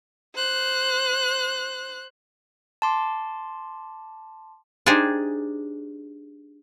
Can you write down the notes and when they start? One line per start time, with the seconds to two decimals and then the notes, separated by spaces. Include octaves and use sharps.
0.35 C5 F#6
2.82 A5 C6 D6
4.86 D4 D#4 G4 G#4 C5